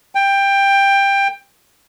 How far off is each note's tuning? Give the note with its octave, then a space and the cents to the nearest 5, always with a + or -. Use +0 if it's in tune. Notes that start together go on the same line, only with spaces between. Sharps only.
G5 +15